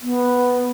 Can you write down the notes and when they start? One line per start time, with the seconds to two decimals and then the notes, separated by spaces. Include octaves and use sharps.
0.01 B3